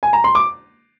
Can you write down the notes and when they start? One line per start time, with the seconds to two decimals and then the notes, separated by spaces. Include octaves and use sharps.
0.03 G#5
0.13 A#5
0.24 C6
0.35 D6